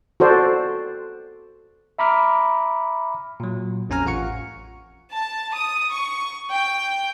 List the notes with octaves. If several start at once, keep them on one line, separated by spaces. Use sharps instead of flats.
F#4 A4 C5 D5
E5 A#5 B5 D6 F6
A#2 F#3
A#1 F2 C#4 G#5 A#5 F6
A1 F4 F5 F#5 C#6 C#7
A5
D#6
C#6
G5